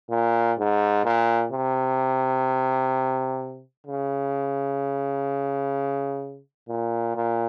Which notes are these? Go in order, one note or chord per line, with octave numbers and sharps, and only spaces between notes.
A#2
G#2
A#2
C3
C#3
A#2
A#2